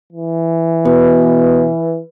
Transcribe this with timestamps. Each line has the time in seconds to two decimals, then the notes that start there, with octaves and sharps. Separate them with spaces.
0.13 E3
0.85 B2 B4